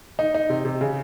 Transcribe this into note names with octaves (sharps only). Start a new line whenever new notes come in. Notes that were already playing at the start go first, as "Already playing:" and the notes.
D#4
D#4
C3
C3
C#3